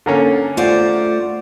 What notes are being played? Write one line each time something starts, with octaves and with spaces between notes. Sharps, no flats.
D3 A#3 C#4 A4
A3 F4 C5 D5 F5 F#5